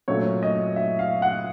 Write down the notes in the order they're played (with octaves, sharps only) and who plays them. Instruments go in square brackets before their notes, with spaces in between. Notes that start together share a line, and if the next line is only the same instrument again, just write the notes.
[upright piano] A#2 F#3 A3 C#4 C#5
D#5
E5
F5
F#5